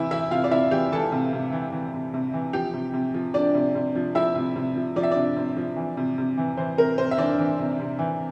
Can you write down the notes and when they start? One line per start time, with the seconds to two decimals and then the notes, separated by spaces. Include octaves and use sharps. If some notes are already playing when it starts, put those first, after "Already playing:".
Already playing: C3 E3 E4 E5
0.11 E3 E4 E5
0.31 C3 F4 F5
0.44 D5
0.51 C3 E4 E5
0.71 E3 G4 G5
0.92 E3 A4 A5
1.12 C3
1.33 C3
1.52 E3
1.72 E3
1.94 C3
2.14 C3
2.33 E3
2.53 F3 G4 G5
2.73 C3
2.93 C3
3.14 F3
3.34 F3 D4 D5
3.55 C3
3.75 C3
3.96 F3
4.15 F3 E4 E5
4.35 C3
4.56 C3
4.76 F3
4.96 F3 D5
5.03 E5
5.11 C3 D4 D5
5.36 C3
5.57 F3
5.76 E3
5.97 C3
6.18 C3
6.37 E3
6.57 E3 C5
6.77 C3 A#4
6.98 C3 C5
7.11 E5
7.18 E3 D4 D5
7.39 E3
7.59 C3
7.79 C3
7.99 E3